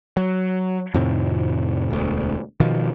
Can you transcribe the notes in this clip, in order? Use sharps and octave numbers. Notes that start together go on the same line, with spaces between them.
F#3
F2 A2 C3 D#3
E1 D2
B2 D#3 F3